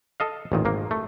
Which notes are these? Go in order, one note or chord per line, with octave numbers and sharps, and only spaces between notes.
A4 D#5 F5
A1 A#2 D#3
G#1 A#3
A3